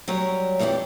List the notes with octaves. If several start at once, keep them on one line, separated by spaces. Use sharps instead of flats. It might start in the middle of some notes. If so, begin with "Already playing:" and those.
F#3 G3 A#4 C#5
F2 E3 D4 F#4 G4